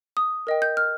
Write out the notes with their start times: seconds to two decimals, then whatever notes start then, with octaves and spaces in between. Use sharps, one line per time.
0.17 D#6
0.47 A#4 D#5 G5
0.62 G6
0.77 F6